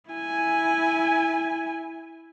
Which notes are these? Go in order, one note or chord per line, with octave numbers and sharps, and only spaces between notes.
E4 G#5